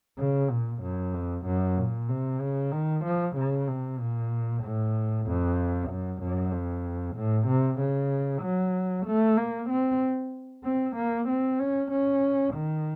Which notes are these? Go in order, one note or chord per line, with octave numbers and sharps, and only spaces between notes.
C#3
A#2
F#2
F2
F#2
A#2
C3
C#3
D#3
F3
C#3
C3
A#2
A2
F2
F#2
F#2
F2
A2
C3
C#3
F#3
A3
A#3
C4
C4
A#3
C4
C#4
C#4
D#3